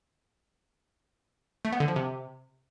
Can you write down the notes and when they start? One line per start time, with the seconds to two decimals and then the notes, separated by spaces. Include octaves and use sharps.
1.65 A3
1.72 B3
1.80 D3
1.88 F3
1.96 C3